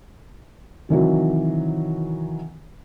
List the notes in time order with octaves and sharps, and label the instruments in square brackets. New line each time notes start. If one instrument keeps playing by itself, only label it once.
[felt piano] C3 D#3 E3 F#3